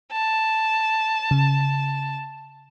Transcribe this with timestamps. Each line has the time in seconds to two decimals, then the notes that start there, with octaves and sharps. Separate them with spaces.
0.13 A5
1.31 C#3